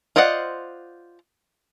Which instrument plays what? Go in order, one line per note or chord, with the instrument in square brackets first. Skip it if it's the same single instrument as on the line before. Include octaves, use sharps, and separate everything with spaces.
[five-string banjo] F4 C5 D5 D#5 F#5